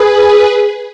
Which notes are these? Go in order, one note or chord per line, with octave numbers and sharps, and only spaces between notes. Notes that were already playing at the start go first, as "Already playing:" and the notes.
Already playing: G#4 B4